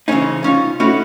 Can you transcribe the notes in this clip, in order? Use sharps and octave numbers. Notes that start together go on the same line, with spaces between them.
C#3 E3 A#3 C4 C#4 D#4
C2 C#4 D#4 F4
A3 C#4 D#4 E4 F#4